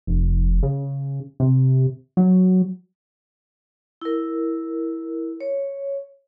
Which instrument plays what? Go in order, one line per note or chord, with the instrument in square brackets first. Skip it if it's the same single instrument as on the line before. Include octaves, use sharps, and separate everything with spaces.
[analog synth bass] F1
C#3
C3
F#3
[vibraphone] E4 A#4
C#5